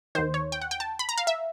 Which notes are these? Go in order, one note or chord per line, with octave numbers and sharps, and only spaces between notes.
D#2 D#3 C5
C#5
G5
F#5
G5
A5
B5
A#5
F5
E5